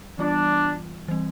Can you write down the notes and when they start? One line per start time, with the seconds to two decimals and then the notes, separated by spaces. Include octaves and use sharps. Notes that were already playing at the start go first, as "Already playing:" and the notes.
Already playing: G3
0.18 E3 G3 B3 D4 F4
1.08 E3 G3 C4